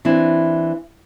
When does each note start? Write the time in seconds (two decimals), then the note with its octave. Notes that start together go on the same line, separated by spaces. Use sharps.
0.05 E3 C4 D4 E4